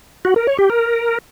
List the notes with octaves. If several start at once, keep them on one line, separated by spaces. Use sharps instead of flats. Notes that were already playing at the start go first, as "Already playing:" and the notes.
F#4
A#4
C#5
G4
A#4